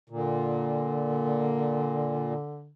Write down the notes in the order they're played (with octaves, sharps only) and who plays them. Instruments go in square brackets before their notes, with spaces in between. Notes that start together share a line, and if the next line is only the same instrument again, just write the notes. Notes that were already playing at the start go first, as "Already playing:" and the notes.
[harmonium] A#2 [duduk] D3